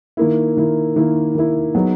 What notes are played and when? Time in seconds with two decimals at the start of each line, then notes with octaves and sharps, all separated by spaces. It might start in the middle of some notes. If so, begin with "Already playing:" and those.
0.17 D#3 A#3 E4
0.57 D#3 A#3 E4
0.96 D#3 A#3 E4
1.35 D#3 A#3 E4
1.74 F#3 B3 D#4 G#4 B4